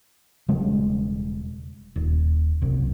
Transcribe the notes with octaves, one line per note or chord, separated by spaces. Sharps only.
E1 C#3 G3 G#3
D#1
F#1 C2